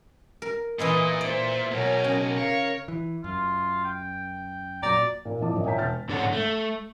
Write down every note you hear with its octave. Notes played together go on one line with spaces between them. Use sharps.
A#4
A#2 E3 E4 D#5 C6
C5 D5 E5
B1 B2 A#4 C#5 G#5
C#3
A#4 C#5 F5
E3
F#2 F4
G5
F#2 A#2 F#3 D5 A#5
A#2 A#3
G#1 F2 E3 D#5 A5 D6
F#1 C2 A#2 D#5
C#5 E5 G5 G#5 A#5 B6
E1 A5 F6 G6 A6
G#2 D4 G#4 A4 C#5 F#5
A3